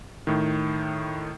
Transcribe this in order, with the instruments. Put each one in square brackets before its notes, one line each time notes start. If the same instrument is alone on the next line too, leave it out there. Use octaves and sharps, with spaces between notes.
[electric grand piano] A2 D#3